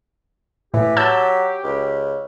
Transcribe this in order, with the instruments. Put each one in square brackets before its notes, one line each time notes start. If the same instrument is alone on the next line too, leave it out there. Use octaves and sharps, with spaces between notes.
[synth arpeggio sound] A2 [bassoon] E3 [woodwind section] G4
[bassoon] F#3 [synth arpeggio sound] A5 E6 G6
[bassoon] C#2